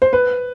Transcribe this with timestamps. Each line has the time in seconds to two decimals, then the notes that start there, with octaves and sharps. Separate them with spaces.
0.02 C5
0.13 B4